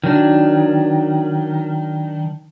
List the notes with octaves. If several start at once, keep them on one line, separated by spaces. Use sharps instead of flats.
D#3 F#3 D4